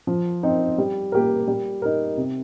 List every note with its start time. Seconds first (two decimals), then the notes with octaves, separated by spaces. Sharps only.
0.07 F3
0.43 C4 D#4
0.78 G3
1.12 A#3 G4 A#4
1.47 G3
1.82 D#4 A#4
2.17 C3